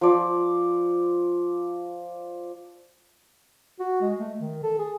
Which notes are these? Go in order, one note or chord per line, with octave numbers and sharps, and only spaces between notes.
F3 D5
F#4
G#3
A3
D#3
A4
G#4